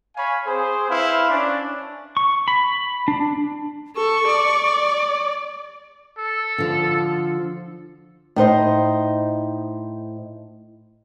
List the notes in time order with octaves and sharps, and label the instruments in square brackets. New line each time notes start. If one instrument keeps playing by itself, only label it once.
[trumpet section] C#5 F5 G#5 B5
C4 G#4 C5
E4 B4 C5 F5
C#4 D4
[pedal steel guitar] C#6
B5
D4
[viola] A4 [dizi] C#6
[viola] D5
[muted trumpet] A4
[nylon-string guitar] D3 F3
[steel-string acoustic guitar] A2 D#4 C5 D#5